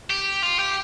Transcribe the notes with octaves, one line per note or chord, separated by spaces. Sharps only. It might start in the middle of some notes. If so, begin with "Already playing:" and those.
G4
F4
G4